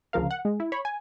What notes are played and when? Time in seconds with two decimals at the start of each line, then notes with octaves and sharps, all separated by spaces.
0.13 D2 C#3 F3 A#4 F5
0.31 F#5
0.45 G#3
0.60 E4
0.72 C#5 B5
0.85 G#5